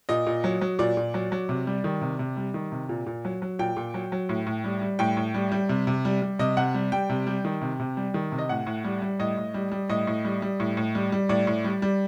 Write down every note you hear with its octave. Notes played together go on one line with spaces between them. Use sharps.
A#2 D#5
A#2
F#3
F#3
A#2 D5
A#2
F#3
F#3
C3
G3
D#3
C3
C3
G3
D#3
C3
A#2
A#2
F#3
F#3
A#2 G5
A#2
F#3
F#3
A2
A2
G3
G3
A2 G5
A2
G3
G3
C3
C3
G3
G3
C3 D#5
C3 F#5
G3
G3 G5
C3
G3
D#3
C3
C3
G3
D#3
C3
D#5
A2 F#5
A2
G3
G3
A2 D#5
A2
G3
G3
A2 D#5
A2
G3
G3
A2
A2
G3
G3
A2 D5
A2
G3
G3